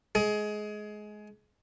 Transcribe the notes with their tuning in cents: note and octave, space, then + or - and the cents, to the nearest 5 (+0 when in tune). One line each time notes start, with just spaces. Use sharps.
G#3 +20 G#4 +20